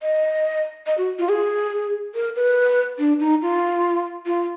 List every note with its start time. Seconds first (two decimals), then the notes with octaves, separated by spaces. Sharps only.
0.03 D#5
0.87 D#5
0.98 F#4
1.19 F4
1.29 G#4
2.15 A#4
2.36 B4
2.99 D4
3.20 D#4
3.42 F4
4.26 F4